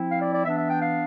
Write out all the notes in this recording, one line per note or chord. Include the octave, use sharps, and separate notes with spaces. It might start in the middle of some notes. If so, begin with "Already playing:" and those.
Already playing: F3 C4 E4
F5
D5
D5
E3 B3 D4 E5
E5
G5
F5